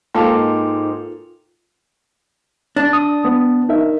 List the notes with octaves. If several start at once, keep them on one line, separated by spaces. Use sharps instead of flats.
G#2 A#3 F4 A4 G5 C6 D6 F7
D4
D#6
B3
D#4 A#4 E5